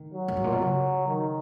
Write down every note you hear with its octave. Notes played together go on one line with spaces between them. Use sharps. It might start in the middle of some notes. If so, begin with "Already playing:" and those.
Already playing: D#3
F#3
F#2
G#2
A#2
B2
C#3 F#3
D#3